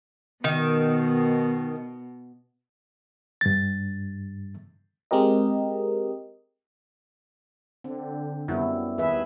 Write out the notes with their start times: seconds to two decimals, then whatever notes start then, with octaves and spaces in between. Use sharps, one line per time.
0.44 B2 D#3
3.41 G2 A6
5.11 G#3 C4 G4 A#4 D#5
7.84 D3 C4
8.48 F#2 G3 B3 E4
8.98 D#2 G#4 B4 E5